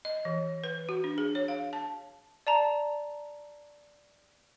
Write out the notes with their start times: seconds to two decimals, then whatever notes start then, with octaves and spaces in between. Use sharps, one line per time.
0.05 D#5
0.25 E3
0.64 B4
0.89 F#4
1.04 D4
1.18 G#4
1.35 C#5
1.48 F5
1.73 A5
2.47 D5 A5 A#5